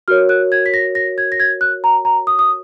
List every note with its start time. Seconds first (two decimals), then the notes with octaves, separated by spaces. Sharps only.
0.08 F#4 A#4 C#5 F6
0.29 F#6
0.52 G#6
0.66 B6
0.74 A#6
0.95 A#6
1.18 G#6
1.32 A#6
1.40 G#6
1.61 F#6
1.84 A#5
2.05 A#5
2.27 D#6
2.39 D#6